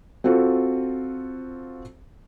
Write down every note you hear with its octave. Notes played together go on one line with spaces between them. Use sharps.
C4 F4 F#4 A4